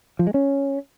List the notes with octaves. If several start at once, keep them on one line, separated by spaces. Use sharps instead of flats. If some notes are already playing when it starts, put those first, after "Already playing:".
F3
G#3
C#4